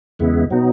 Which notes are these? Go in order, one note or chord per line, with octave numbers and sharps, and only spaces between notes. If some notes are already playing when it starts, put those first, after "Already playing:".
E2 C#3 G#3 B3 E4
B2 F#3 B3 D#4